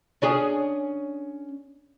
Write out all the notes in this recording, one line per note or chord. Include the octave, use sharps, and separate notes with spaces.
C#4 D4 G#4